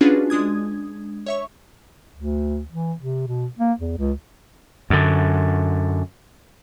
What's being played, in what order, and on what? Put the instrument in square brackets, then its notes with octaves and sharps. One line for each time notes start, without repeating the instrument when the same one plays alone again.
[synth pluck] C#4 D4 F4 F#4 G#4 B4
G#3 D4 D#6 G#6
C#5 E5 C#6
[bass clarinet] D2
E3
C3
B2
A#3
E2
C#2
[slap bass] F#2 D3